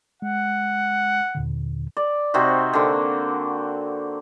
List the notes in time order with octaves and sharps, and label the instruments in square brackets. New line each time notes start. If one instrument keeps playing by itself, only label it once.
[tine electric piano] G#3 [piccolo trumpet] F#5
[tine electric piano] D#2 A#2 D3
[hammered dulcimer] D5
C3 C4 D#4 F#4
D3 A#3